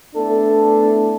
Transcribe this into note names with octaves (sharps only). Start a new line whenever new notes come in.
A3 B3 D4 E4 A4